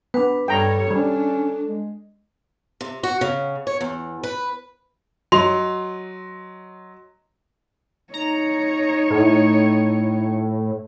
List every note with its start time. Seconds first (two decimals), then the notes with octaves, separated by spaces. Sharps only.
0.14 B3 D4 B4
0.48 G2 G3 A4 C#5 G5 A#5
0.91 G3 C#4 D4
1.65 G#3
2.81 C3
3.03 F#4
3.21 C#3
3.67 C#5
3.81 E2
4.23 B4
5.32 F#3 D#5 C6 F7
8.14 D#4 C#5 A#5
9.10 A2